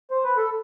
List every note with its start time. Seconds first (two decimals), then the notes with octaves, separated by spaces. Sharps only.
0.11 C5
0.24 B4
0.37 A4